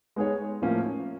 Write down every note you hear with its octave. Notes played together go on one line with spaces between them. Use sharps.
G#3 B3 D#4 G#4 C#5
A2 F3 A#3 C#4